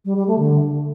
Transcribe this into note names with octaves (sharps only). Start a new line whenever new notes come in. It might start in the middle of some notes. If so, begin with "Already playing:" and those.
G3
G3
A3
D3